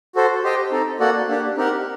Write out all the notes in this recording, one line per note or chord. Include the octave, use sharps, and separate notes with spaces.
F#4 A4 C5
G4 C5 D#5 G5
C4 D#4 A4
A#3 F#4 A4 D5 F#5
A#3 D4 G4
C4 D#4 G4 A#4 F#5